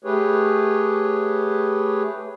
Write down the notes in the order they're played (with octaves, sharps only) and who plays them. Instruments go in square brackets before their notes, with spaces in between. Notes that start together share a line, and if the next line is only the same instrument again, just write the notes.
[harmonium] A3 G4 G#4 B4 C#5